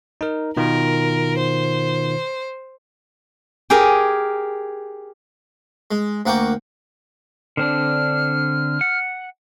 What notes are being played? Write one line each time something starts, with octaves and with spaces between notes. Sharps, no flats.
D#4 A#4
B2 D#3 F4 A#4
C5
G4 G#4 A#4 G#5
G#3
D2 A#3 F#5 G5 C#6 D6
D3 C4 D4 F6
F#5